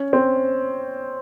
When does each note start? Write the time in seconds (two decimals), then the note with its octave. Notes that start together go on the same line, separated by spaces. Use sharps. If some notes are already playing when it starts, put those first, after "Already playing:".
Already playing: C#4
0.13 C4